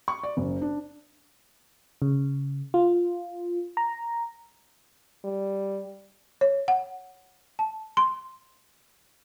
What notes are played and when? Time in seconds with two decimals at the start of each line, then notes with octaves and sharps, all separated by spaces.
0.08 C#6
0.23 D5
0.37 F#1
0.62 D4
2.02 C#3
2.74 F4
3.77 A#5
5.24 G3
6.41 C#5
6.68 F#5
7.59 A5
7.97 C6